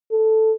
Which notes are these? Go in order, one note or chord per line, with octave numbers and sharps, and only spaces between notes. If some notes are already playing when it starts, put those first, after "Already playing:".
A4